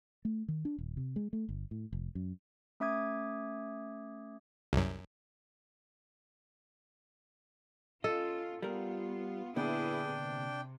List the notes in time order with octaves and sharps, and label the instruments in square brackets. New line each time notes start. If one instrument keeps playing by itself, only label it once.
[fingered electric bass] A3
D#3
D4
D#1
C3
G#3
A3
G1
A2
F1
F#2
[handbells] A3 C#4 E5 D6 D#6 G#6
[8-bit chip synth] C2 F#2
[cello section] C#4 F4 [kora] A4 [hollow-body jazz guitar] D#5
[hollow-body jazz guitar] G3 A#4 [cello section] B3 F4
[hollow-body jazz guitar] A#2 D3 B3 [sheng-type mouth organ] D4 G5 [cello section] E4 G#4 B4
[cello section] C3